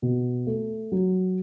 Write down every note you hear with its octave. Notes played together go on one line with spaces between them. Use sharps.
B2
A3
F#3